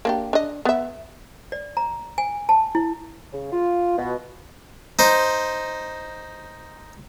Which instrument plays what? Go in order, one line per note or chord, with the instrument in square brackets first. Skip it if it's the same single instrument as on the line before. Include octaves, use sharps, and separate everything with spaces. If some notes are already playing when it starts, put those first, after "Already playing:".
[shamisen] A#3 D4 G4
D4 D#5
B3 E5
[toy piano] D5
A#5
G#5
A5
E4
[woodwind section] C#3
F4
B2
[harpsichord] D#4 C5